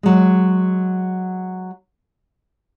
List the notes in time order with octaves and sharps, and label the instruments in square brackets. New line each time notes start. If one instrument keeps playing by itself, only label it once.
[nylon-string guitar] F#3 G#3